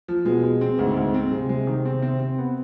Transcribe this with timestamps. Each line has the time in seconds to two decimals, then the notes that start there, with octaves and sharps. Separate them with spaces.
0.08 F3
0.26 B2 G#3
0.43 G#3
0.61 C4
0.79 D2 G#2
0.97 D2
1.14 C4
1.31 C3 G#3
1.49 G#3
1.67 D#3
1.85 C4
2.02 C4
2.20 C4
2.38 B3